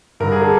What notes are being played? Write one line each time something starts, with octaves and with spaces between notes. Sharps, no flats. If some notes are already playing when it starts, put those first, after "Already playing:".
G2 D3 A#4
G#4
A4